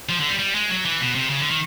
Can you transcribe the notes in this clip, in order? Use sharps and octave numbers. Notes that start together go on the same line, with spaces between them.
F3
D3
G3
G3
G#3
F#3
E3
B2
C3
C#3
D3
D#3